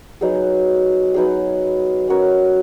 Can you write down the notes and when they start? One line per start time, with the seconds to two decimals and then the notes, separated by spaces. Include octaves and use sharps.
0.21 F#3 B3 D#4 G#4
1.14 F#3 B3 D#4 G#4
2.08 C#4 F#4 A#4 C#5